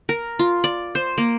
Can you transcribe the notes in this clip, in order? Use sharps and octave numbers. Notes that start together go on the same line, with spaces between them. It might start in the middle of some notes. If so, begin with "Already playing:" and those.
A#4
F4
D5
C5
A#3